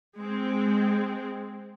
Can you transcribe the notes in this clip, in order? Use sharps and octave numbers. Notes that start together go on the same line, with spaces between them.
G#3 C4